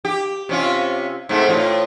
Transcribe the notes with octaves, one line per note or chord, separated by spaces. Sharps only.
G4
C3 C#4 F4
G#2 C3 A3
A2 F4